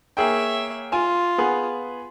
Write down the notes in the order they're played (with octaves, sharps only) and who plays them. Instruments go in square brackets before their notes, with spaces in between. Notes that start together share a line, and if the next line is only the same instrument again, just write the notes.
[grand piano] A#3 G#4 G5 [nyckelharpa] C#5 E5
[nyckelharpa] F4 [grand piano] G#5
[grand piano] B3 G#4